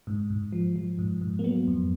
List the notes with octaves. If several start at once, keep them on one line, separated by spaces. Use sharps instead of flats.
G#2
G#2
F3
F3
G#2
G#2
A#3
F#3 B3
F2